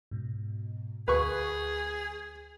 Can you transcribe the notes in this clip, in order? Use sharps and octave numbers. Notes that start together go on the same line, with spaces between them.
G#2 B2
D2 G#4 B4 C#6